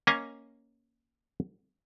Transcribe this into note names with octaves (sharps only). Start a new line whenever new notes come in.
A#3 C#4 D#5 F5 G#5 A#5